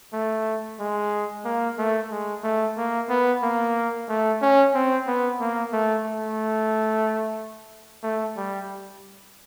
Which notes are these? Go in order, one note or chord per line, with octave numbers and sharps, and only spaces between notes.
A3
G#3
A#3
A3
G#3
A3
A#3
B3
A#3
A3
C#4
C4
B3
A#3
A3
A3
A3
G3